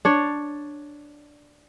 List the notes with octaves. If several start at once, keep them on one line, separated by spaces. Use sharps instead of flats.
D4 C#5